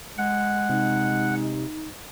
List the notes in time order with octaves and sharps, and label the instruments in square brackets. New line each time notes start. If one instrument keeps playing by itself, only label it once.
[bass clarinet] G#3 [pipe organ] F#5
[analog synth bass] C3 [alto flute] D#4